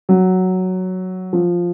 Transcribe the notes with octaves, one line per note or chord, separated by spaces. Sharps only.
F#3
F3